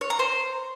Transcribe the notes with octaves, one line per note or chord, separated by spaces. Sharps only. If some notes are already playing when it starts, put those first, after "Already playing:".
C#5
A#5
C5